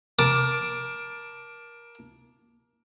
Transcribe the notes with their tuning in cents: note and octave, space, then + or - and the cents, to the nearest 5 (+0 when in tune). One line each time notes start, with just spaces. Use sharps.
A#4 +20 A5 +0 D6 +0